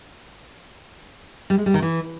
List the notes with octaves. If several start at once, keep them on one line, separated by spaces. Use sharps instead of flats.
G3
G#3
G3
D#3
E3